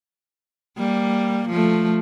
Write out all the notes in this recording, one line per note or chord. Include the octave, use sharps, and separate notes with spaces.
G3 A#3
F3 A3